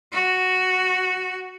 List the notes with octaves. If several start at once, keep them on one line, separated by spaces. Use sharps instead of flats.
F#4